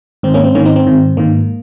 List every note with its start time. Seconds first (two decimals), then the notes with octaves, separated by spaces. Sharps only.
0.23 G#2 D#3 C4
0.34 A#3 C#4
0.44 C4
0.55 G#2 D#3 A#3 C#4
0.65 C4 D#4
0.76 C4
0.87 G#2 D#3
1.17 G#2 D#3 A#3